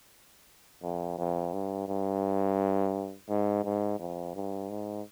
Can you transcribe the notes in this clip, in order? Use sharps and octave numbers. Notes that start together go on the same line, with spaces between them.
F2
F2
G2
G2
G#2
G#2
F2
G2
G#2